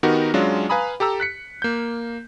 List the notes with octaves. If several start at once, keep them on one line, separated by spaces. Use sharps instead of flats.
D#3 B3 D#4 F#4 G4 A#4
F#3 G#3 C#4 D4 F4
B4 F5 G#5 A#5 B5 D#6
G4 A4 A#5 E6
F#6 B6 C#7
A#3 G6